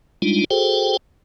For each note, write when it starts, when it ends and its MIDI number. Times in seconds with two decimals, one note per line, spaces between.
0.22 0.44 55
0.22 0.44 56
0.22 0.44 62
0.22 0.44 63
0.22 0.44 65
0.51 0.97 66
0.51 0.97 68
0.51 0.97 69
0.51 0.97 72
0.51 0.97 79